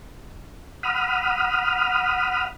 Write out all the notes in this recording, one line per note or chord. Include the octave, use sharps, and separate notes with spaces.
F#5 B5 D#6 F6